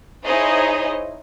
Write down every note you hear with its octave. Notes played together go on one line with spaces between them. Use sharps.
D#4 E4 G#4 C5 C#5 D#5